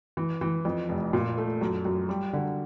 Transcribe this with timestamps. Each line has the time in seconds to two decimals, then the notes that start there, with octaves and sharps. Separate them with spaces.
0.17 E3
0.41 E3
0.65 F2
0.89 F1
1.13 A#2
1.38 A3
1.61 F#2
1.85 F#2
2.09 G3
2.33 D3